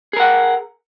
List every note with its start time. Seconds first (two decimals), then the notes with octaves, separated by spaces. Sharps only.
0.13 G#4
0.17 A#4
0.20 F#5